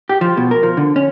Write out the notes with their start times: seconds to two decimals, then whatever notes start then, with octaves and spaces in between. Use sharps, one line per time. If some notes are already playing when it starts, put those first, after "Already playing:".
0.09 G4
0.21 F3
0.37 B2
0.51 A#4
0.63 F3
0.77 D3
0.96 C#4